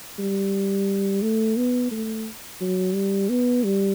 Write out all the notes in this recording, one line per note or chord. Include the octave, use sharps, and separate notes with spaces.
G3
A3
B3
A3
F#3
G3
B3
G3